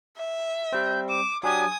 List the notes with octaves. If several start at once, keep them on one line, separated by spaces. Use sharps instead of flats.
E5
G3 C4 G6
D6 E7
F#3 D4 G4 G#5 D#6